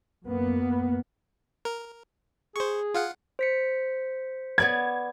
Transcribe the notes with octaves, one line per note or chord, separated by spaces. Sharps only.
F#2 A#3 B3
A#4
G#4 C5 C#6
F4 F5 F#5
C5 B6 C#7
B3 D5 B5 G#6